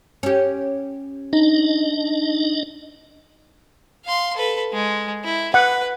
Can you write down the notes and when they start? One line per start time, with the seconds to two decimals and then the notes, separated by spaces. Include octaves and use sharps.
0.23 C#4 G4
1.33 D4 D#4 D#5
4.05 F5 C6
4.36 A4 B4
4.73 G#3
5.25 E4
5.54 B4 F#5